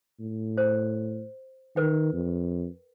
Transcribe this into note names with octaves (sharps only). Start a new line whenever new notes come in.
A2
C5
D#3 A#4 B4 G5
F2